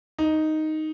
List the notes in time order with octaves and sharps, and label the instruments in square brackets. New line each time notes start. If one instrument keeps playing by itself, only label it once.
[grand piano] D#4